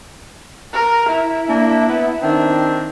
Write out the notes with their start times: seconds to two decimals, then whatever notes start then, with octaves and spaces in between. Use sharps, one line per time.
0.73 A#4
1.09 E4
1.48 A#3 D4
1.89 B3
2.21 D#3 C4 D4